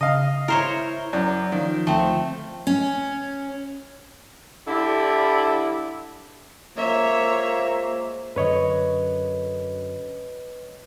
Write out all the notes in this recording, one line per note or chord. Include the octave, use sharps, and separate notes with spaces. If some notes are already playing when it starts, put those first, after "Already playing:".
C#3 D#5 F5
E4 A#4 C5 C#5
F#2 D5
D#3 F3
D2 A3 C4
C#4
D3 G3 E4
G#3 A#3 F4 C5 C#5 E5
F#2 D3 B4 C#5 D#5